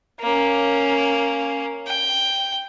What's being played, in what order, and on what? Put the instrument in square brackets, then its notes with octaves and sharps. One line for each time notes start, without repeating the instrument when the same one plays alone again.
[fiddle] A#3 C#4
G5